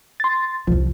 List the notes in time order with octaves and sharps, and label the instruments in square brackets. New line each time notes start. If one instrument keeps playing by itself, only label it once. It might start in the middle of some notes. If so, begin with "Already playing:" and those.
[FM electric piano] C6 A6
[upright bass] C2 F2 [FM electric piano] F3